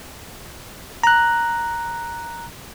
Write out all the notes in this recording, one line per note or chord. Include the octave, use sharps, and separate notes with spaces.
A#5 F#6